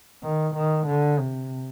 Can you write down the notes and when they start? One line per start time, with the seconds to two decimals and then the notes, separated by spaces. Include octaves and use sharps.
0.23 D#3
0.55 D#3
0.87 D3
1.19 C3